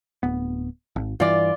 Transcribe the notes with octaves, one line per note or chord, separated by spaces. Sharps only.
D1 B3
G#1
G2 E3 F4 D5